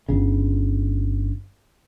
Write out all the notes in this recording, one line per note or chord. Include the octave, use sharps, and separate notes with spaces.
G1 C#3